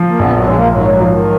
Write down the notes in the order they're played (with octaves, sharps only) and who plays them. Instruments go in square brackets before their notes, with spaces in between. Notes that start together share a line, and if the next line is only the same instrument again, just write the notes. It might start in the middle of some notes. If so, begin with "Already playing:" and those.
Already playing: [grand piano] F3
[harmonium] A#3
[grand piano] A#1 [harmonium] B3
[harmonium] F#3
[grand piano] A#1 [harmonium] G#3
[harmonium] A#3
[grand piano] G#2 [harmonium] F#3
[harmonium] F#3
[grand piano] F3
[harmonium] D#3